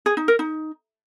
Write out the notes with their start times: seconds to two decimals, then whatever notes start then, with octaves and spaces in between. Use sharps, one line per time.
0.06 G#4
0.17 D#4
0.28 A#4
0.39 D#4